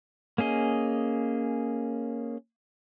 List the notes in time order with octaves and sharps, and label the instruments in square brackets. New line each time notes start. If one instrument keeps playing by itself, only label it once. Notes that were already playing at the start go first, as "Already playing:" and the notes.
[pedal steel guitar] A#3 C#4 G#4 D#5